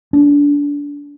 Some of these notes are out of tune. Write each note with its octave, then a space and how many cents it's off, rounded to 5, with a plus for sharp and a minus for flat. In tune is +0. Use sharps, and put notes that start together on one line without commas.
D4 -25